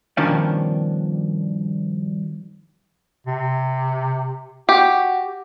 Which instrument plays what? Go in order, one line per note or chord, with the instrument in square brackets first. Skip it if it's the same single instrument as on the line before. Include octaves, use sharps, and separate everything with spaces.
[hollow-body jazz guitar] G2 B2 D#3 F3 C#4 D4
[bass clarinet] C3
[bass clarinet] F#4 [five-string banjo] G4